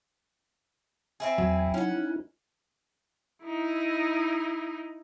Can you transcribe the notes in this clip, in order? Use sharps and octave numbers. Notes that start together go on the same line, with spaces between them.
C4 E4 G#4
E2 F#3 G#5
C#4 D#4 E4 F#5
D#4 E4